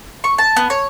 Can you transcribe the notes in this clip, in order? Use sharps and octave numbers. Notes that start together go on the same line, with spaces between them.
C#6
A5
B3
C#5